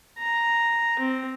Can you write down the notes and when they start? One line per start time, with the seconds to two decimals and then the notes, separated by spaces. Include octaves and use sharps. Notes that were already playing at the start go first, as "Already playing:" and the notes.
0.18 A#5
0.99 C4